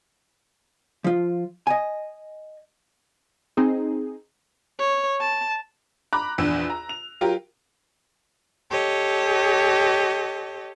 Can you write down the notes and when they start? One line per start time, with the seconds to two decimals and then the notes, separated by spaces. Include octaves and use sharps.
1.04 F3 F4
1.67 D#5 G#5
3.57 C4 D#4 G#4
4.79 C#5
5.21 A5
6.13 A#5 B5 D6 F#6
6.38 A#1 E2 D4 E6
6.70 A#5
6.89 F7
7.21 F#3 F4 G4 A#4
8.71 G4 A4 C#5 D#5